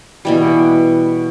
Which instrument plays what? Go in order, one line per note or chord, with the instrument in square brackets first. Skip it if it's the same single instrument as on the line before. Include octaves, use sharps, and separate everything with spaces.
[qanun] B2 E3 G3